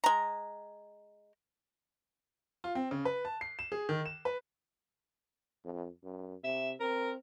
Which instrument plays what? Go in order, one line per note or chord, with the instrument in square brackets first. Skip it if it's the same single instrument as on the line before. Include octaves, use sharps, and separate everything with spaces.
[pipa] G#3 A#5
[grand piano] F4
C4
C#3
B4
A5
C7
E7
G#4
D#3
E7
B4
[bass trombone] F2
F#2
[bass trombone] C3 [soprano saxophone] E5
[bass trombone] C4 [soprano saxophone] A#4